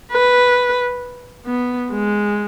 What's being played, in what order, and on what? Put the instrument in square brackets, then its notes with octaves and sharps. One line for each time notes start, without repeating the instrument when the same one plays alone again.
[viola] B4
B3
G#3